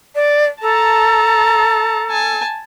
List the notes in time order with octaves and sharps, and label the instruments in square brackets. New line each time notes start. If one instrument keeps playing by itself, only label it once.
[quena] D5
[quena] A4 [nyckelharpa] A5 A#5
[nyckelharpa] G#5 A5